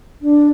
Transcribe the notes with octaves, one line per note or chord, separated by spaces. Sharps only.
D4